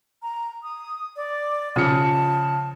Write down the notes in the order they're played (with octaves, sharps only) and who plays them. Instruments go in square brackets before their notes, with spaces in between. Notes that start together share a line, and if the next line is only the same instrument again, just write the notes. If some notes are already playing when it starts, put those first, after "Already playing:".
[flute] A#5
D#6
D5
[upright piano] C#3 F3 C#7 [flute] A5